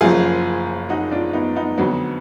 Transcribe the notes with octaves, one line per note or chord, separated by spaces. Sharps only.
F#1 F#2 F3 F4 G#4
D#4 F#4
D4 F4
B3 D#4
B3 D#4
F2 D3 F#3 B3